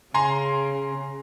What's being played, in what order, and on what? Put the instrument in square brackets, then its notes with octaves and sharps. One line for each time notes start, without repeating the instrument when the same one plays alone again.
[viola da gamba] C#3 [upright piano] G#5 A#5 C6